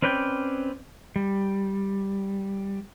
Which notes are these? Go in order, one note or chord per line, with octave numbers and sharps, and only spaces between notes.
C4 C#4 B4 D5 G5
G3